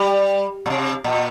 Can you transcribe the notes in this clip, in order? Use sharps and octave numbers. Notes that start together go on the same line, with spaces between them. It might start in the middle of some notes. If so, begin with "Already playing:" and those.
Already playing: G3
A#2
C3
A#2